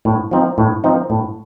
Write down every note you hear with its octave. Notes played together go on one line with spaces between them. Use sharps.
A2
F3 C4 D#4
A2
F3 C4 D#4
A2